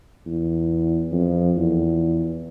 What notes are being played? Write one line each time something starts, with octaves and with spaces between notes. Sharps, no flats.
E2
F2
E2